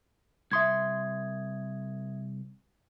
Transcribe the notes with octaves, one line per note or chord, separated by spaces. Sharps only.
C2 E5 C6 D#6 G#6